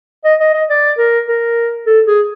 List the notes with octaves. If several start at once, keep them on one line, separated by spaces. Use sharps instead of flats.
D#5
D#5
D#5
D5
A#4
A#4
A4
G#4